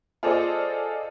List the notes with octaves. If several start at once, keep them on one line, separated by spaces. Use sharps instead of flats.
F4 G#4 A4 C5 D5 D#5